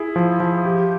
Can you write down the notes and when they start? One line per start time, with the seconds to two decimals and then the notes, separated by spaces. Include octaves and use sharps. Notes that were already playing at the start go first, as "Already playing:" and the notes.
Already playing: E4 G#4
0.16 F3
0.40 F3
0.65 G4